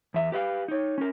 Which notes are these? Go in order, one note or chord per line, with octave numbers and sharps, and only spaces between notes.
E2 E5
G4 B4 E5 F5
D#4 C#5
C#4 A#4